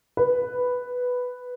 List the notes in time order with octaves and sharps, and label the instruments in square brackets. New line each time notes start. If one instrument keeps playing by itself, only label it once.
[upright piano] B4